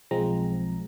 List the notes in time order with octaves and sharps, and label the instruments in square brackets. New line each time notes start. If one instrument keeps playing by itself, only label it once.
[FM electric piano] B1 F3 G#3 C4 A#5